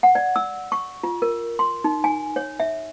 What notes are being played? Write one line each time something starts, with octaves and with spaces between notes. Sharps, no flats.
F#5
D5
E6
C#6
F4
A#4
C6
D#4
G#5
C#5
E5